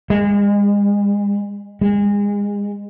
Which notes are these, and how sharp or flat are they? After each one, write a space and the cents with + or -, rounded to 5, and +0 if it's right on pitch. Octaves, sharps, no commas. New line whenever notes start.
G#3 -35
G#3 -30